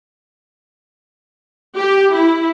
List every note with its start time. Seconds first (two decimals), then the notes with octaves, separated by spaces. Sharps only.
1.77 G4
2.14 E4